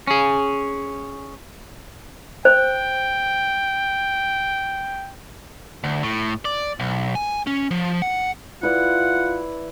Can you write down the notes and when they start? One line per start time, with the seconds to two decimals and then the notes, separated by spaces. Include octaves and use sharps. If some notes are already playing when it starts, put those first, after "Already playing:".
0.07 C#4 G#4
2.45 C5 G5
5.84 D2
6.03 A2
6.45 D5
6.80 B1
7.15 G#5
7.47 C#4
7.71 F3
8.02 F#5
8.63 E4 F4 B4 D5 F#5